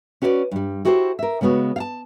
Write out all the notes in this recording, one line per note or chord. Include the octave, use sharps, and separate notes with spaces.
C#4 F#4 B4 C5 D5
G2 G3
E4 F#4 G4 A4 B4 C5
A#4 E5
C#3 G#3 B3 F#4 C#5
F5 A5